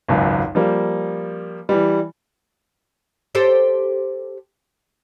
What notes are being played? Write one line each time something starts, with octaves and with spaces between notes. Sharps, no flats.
G#1 C#2 F#2
F3 G3 A#3
E3 G3
G4 A4 C5